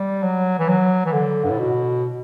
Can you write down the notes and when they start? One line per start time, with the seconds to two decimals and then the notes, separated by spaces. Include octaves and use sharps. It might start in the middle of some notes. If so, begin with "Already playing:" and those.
Already playing: G3
0.23 F#3
0.59 E3
0.68 F#3
1.05 E3
1.12 D3
1.44 G2
1.50 A2
1.58 B2